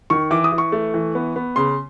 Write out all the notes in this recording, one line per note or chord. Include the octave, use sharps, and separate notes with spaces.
D#3 C#6
E3 D6
D#6
E3
C#6
A3
E3
B3
B3
C#3 C6